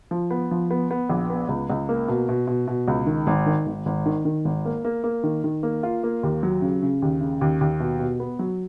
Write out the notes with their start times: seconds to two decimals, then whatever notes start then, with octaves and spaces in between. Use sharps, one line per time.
0.11 F3
0.31 B3
0.51 F3
0.71 B3
0.91 B3
1.10 A#1
1.30 B3
1.49 C#2
1.70 C#2
1.89 A#3
2.08 B2
2.29 B2
2.47 B2
2.68 B2
2.88 C#2
3.06 D#3
3.27 G#1
3.46 D#3
3.67 G#1
3.86 G#1
4.06 D#3
4.25 D#3
4.45 G#1
4.65 A#3
4.85 A#3
5.04 A#3
5.24 D#3
5.44 D#3
5.63 A#3
5.83 F4
6.03 A#3
6.23 D#2
6.43 F#3
6.61 C#3
6.82 C#3
7.02 D#2
7.21 C#3
7.41 D#2
7.61 D#2
7.80 B2
8.00 B2
8.20 B3
8.39 F#3